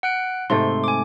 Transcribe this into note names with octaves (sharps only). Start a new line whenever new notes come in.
F#5 F#6 D7
G#2 C3 A3 C6
G#5 D6